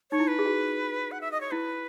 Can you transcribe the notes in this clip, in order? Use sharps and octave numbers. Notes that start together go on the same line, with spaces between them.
D#4 C#5
E4
B4
G#4
F#4
F#5
E5
D#5
C#5
E4 B4